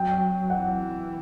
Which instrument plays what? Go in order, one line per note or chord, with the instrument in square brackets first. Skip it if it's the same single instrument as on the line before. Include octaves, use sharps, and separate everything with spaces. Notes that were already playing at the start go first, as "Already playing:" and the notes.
Already playing: [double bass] F#3 [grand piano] G5
[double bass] E3 [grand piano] F#5